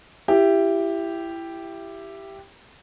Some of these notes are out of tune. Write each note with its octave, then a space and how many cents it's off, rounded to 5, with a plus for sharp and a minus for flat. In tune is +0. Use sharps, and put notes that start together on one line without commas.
E4 +20 G4 +0